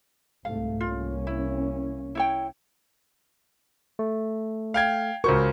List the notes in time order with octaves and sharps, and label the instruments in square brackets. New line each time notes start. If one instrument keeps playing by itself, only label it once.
[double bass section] C2 G#2 A3 [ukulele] F5
[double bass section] C2 A#3 C#4 [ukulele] F4
[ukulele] E4
E4 C#5 G5
[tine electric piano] A3
[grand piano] F5 G5 G#6
[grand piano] C#2 C5 C#6 [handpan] F#4 A#4